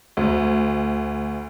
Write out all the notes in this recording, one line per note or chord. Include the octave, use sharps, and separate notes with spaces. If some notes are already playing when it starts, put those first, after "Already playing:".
D2